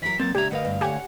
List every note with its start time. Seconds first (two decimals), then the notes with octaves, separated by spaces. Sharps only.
0.02 E3 F#3 A#4 B6
0.20 F#3 A#3 C4 A6
0.35 C#2 D4 G4 E5 A#5 G#6
0.51 D2 A#4 B4 D#5 F5 F#5
0.65 G2
0.81 D3 G4 B4 C#5 F#5 G#5